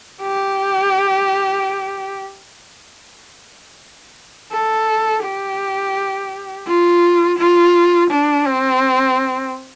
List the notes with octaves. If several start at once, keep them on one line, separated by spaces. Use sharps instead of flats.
G4
A4
G4
F4
F4
D4
C4